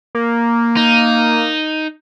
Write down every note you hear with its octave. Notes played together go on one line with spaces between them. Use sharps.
A#3
D#4